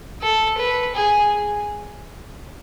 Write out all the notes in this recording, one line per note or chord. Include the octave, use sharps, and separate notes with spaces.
A4
B4
G#4